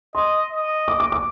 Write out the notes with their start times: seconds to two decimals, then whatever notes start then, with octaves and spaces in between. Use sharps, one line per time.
0.15 D#5 C6
0.51 D#5
0.88 D6
1.00 D6
1.12 D6